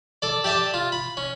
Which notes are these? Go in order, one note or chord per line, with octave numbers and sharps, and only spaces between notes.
A4 D5
G4 D5 E5 A5 D#6
F4
B5
C#4